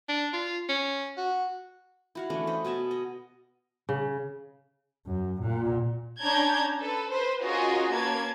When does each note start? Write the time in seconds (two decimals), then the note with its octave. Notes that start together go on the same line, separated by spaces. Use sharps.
0.09 D4
0.33 F4
0.69 C#4
1.17 F#4
2.15 E4 F#4 F5
2.30 E3 A3 C#4 D4
2.47 C5 D#5 B5
2.65 B2 F#4 G#5 A5
2.91 D#5
3.89 C#3
5.07 F#2
5.42 A#2
6.20 C#4 D4 A5 A#5 G6 G#6
6.78 A4 B4
7.09 B4 C5
7.41 C#4 F4 F#4 G#4 A#4 D#5
7.91 A#3 C#4 B4 A5 G#6